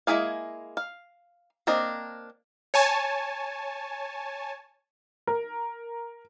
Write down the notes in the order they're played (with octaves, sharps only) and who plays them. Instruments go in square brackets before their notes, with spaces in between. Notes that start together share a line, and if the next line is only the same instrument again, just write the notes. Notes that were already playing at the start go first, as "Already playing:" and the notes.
[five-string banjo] G#3 A#3 E4 G#4 F5
F5
A#3 C4 D4 A#4 D#5
[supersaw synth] C#5 G#5 A5
[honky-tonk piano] A#4